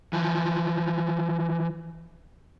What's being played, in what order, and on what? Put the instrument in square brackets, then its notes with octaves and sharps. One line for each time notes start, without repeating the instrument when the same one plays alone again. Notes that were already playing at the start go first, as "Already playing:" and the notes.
[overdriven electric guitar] E3 F3